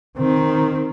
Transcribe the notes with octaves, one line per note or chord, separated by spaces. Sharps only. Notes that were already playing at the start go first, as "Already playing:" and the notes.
D#3 C4